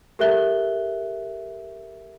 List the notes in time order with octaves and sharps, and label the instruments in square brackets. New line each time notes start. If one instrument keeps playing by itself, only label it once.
[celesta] G4 A4 A#4 E5 F#6 G7